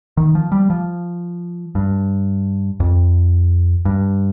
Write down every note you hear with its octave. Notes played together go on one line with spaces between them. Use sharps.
D#3
F3
G3
F3
G2
F2
G2